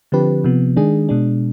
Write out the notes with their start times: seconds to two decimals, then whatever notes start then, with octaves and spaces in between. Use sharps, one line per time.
0.12 D3 F3 C4 G4 B4
0.44 C3 F3 B3
0.77 D#3 G#3 D4 G#4
1.09 B2 G#3 D4